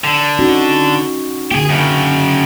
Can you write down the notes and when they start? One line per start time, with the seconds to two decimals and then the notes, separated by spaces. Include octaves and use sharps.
0.04 D3
0.39 C#4 D#4 F#4
1.51 D3 A#3 G4 G#4
1.70 F#2 C#3